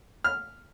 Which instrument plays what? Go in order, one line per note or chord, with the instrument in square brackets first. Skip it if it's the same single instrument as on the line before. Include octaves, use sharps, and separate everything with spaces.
[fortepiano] F6